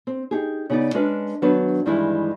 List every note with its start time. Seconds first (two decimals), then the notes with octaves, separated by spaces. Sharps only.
0.07 C4
0.31 D#4 G4 G#4
0.70 C#3 B3 D#4 D5
0.94 G#3 C#4 D4 A#4 B4 D#5
1.42 D#3 F#3 B3 D4 B4
1.86 G2 D#3 E3 G3 G#3 E4